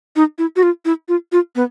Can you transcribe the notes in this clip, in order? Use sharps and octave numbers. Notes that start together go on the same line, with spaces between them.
D#4
E4
F#4
F4
E4
F4
F4
B3